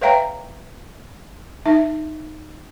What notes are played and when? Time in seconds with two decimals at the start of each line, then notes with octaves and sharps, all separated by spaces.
0.02 B4 C#5 E5 F5 G5 A#5
1.66 D#4 E5